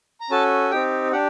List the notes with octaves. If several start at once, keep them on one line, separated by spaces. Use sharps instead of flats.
A#5
C#4 F#4 A4 A5
C4 D#4 G4 G5
D4 G4 F#5